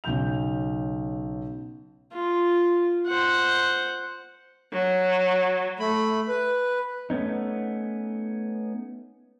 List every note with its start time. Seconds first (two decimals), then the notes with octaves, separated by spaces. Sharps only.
0.04 B1 C#3 F#3 G6 F7
2.13 F4
3.07 C5 F#5
4.72 F#3
5.80 A3 B5
6.28 B4
7.10 A3 B3 C#4 D#4